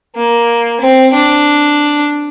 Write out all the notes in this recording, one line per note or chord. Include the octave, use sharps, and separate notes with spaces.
A#3
C4
D4